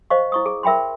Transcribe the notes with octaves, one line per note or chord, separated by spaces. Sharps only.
C5 D#5 F5 C#6
E4 C#6 D#6
G#4
A#4 E5 G5 B5 C6